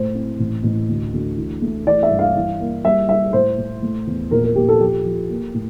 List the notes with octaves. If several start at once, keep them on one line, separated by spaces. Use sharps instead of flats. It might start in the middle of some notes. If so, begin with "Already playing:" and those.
Already playing: A2 A3 C5
C4
A1
A1
D2
D2
E3
A3
E3 D5
E5
G2
F5
E3
A#3
G3 E5
G3 E5
A2 C5
A2
A3
E2
A#1 A#4
A#4
A#1 G4
A4
F3 G4
F3
A#3
A2